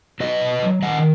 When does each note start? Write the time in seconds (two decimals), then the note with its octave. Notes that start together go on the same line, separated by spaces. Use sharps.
0.20 F#3 B4 D#5
0.41 B2
0.62 F#3
0.82 D#3 D#5 F#5